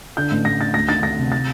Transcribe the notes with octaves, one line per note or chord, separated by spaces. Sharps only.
D3 G6
A1
A1 A#6
D3 A6
D2 A#6
D#3 A6
D2 A#6
C3
A6